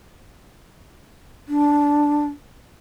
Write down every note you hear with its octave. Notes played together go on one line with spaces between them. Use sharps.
D4